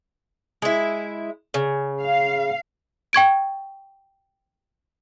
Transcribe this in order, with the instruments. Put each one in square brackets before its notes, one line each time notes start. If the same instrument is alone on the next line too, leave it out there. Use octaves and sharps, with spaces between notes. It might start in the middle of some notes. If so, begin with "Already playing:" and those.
[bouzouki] G#3 E4
C#3
[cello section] F5
[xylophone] G5 C#6 G#6 D7